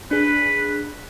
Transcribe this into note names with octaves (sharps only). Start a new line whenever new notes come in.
D4 G#4 B4